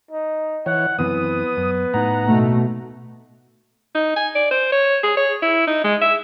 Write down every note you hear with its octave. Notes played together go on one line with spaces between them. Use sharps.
D#4
E3 C#5 F#5
F#2 E3 B3 C4 D#6
F#2
A2 D#4 F#5 A#5
B2 A3
D#4
G#5
D5
C5
C#5
G#4
C#5
E4
D#4
G#3
E5